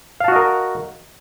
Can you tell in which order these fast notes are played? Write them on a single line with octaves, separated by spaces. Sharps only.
F5 A5 F#4 D#5 A#4